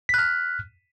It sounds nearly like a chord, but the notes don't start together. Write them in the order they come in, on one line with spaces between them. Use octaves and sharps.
B6 F#6 F6